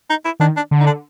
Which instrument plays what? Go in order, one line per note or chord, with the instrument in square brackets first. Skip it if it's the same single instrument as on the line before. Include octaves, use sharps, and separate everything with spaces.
[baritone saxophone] D#4
E4
[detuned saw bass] D#3 [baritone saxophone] D4
[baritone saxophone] D4
[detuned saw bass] D3
[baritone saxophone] D#4
D4